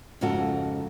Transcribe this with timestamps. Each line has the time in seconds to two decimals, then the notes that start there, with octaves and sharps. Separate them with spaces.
0.21 F2 G#2 C#3 F4 F#4 A4